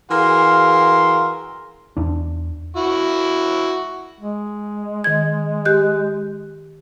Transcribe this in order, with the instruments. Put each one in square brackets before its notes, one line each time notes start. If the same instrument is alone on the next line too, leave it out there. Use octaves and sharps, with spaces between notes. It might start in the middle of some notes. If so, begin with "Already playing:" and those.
[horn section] E3 F#4 G#4 A#4 F5 C6
[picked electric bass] E2 D4
[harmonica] E4 F#4
[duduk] G#3
[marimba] D#3 G#6
G4 F#6 G6